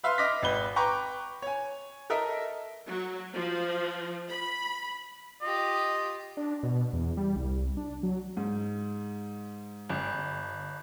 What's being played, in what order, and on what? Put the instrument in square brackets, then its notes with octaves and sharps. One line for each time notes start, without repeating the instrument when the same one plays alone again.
[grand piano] B4 E5 F5 C6 F6
D#5 D6 F6 A#6 B6
G#1 B4 G7
B4 G5 A#5 C#6 D6
C#5 G#5
A4 A#4 D#5 E5
[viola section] F#3
F3
B5
[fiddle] F4 G4 [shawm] D#5
[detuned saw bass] D4
B2
E2
G3
C2
D4
F#3
[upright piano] G#2
[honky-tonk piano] G1